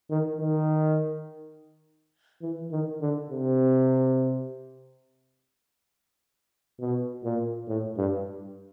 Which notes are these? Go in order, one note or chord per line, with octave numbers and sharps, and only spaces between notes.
D#3
D#3
E3
D#3
D3
C3
B2
A#2
A2
G2